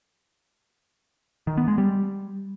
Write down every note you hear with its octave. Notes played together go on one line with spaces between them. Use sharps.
D#3
B3
G#3
G3